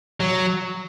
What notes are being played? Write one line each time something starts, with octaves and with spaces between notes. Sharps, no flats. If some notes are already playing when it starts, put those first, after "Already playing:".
F#3